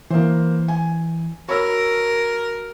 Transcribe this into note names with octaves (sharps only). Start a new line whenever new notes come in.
E3 A#3 C5
G#5
F#4 A#4 C#5 B5 E6